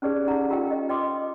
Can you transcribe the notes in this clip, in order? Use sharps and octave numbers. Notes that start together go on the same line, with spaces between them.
C#4 D#4 G4 G#4 B4 D5
D#4 E4 G4 A4 F#5 A#5
F4 G4 A#4 D#5 F5 G5
D#5 G5
B4 D#5 G5 C6 D6 D#6